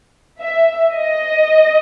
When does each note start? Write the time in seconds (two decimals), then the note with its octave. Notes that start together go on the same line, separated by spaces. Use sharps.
0.40 E5
0.94 D#5